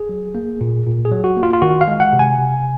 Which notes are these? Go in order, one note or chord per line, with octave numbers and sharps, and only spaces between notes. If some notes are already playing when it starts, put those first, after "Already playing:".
Already playing: G#4
F#3
A#3
A#2
A#2
G#4
F#3
F#4
A#3
F4
F4
D#3 F#4
F5
G#3
F#5
C3
G#5
C3